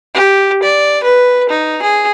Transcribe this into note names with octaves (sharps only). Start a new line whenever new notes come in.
G4
D5
B4
D#4
G#4